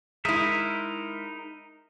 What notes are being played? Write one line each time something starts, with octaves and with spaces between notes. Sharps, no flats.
G#3 D#4 E4 A#4 E5